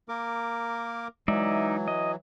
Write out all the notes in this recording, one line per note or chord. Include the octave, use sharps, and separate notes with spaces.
A#3 A#4 D6
E3 F#3 G#3 D#4 D5 E5
D#5